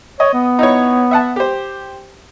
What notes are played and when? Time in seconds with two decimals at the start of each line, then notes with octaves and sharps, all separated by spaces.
0.20 C#5 D#5
0.34 B3
0.59 D#4 E4 C#5
1.11 E5 F#5 A5
1.36 G4 C5